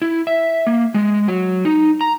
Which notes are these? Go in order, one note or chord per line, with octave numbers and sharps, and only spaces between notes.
E4
E5
A#3
G#3
F#3
D#4
A#5